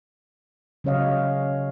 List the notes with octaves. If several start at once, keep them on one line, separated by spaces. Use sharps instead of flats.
C#3 F#3 C#4 C#5 D#5 F5